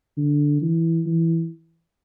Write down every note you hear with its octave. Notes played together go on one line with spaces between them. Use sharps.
D3
E3
E3